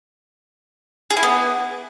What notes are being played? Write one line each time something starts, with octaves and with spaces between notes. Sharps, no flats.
G#4
E4
B3